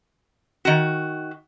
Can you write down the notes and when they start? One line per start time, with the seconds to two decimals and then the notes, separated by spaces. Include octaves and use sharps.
0.65 D#3 F#4